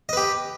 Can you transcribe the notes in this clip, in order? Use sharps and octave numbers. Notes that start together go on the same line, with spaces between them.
G4 B4 D#5